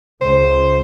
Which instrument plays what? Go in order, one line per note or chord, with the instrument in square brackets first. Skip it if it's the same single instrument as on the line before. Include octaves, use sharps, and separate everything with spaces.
[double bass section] C#2 [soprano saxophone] C5